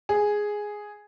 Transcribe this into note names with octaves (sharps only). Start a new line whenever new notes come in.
G#4